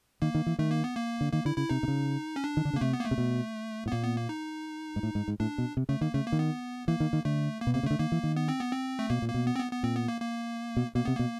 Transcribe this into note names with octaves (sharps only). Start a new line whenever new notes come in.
D#3 A#3
D#3
E3
D#3 A3
A#3
B3
A#3
D3
D#3 A#3
D3 E4
C#3 E4
C3 D#4
C3
C#3
C#4
D4
D#3
D3
C#3
A#3
C3 A3
B3
A#3
A3
C3
B2
A2 B3
A#2 A#3
B3
A#3
D#4
G#2
A2
G#2
G#2
A2 D4
B2
C3
C#3 A3
D#3 A#3
C#3 A3
A#3
D#3
B3
E3 A#3
D#3
D#3
D3 A3
A#3
B2
C3 A#3
C#3
D3 A3
D#3 A#3
E3
D#3
B3
C4
B3
C4
A3
B2 A#3
A#2
A#3
B2
B3
C4
B3
B3
A#2 C4
B3
A#3
A#3
B2
B2 A#3
C3 B3
B2 A#3